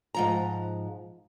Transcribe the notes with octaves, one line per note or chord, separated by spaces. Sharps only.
G#2 F3 A#5